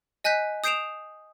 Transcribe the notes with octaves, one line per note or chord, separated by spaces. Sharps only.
D#5 G#5 F#6 G6 B6
D#6 G6 C7 D7 E7 F7